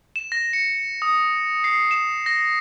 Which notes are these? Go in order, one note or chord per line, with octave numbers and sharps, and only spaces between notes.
E7
A#6
C#7
D#6
C7
E7
A#6